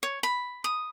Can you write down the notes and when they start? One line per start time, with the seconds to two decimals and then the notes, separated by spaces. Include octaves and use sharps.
0.03 C#5
0.23 B5
0.64 D#6